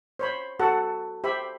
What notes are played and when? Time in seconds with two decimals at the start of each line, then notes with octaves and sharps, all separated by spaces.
0.19 C5 C#5 B5
0.59 F#4 A4 F#5
1.24 G4 C5 E5 B5